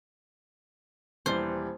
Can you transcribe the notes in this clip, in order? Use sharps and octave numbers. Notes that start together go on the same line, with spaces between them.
D#1 E3 G3 C5